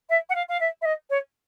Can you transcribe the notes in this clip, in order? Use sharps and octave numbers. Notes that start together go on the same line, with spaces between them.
E5
F#5
F5
F5
E5
E5
D#5
C#5